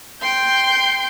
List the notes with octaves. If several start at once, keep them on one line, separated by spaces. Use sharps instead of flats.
G5 C6 G6